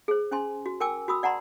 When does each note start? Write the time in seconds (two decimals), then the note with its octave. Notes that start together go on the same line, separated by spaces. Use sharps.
0.08 G#4 C5
0.31 C#4 C5 G#5 C6
0.66 F#4
0.80 A#4 G5 G#5 D6 E6
1.08 F#4 B5 D#6 E6
1.23 D5 F#5 A5 A#5 C6